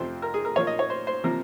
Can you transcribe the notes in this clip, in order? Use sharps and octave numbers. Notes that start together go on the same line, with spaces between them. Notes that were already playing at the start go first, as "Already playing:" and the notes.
Already playing: F2 C3 F3 C4 C5
A#4
G#4
A#4
A#2 F3 A#3 C#5
D#5
C#5
C5
C5
C3 F3 A#3 A#4